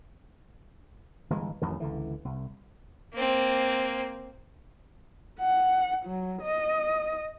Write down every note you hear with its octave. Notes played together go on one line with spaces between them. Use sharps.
G1 E3 G#3
A1 F2 D#3
C#2 D3 E3
C2
A#3 C4
F#5
F#3
D#5